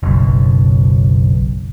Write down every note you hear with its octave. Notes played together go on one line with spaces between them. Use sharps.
F#1 B1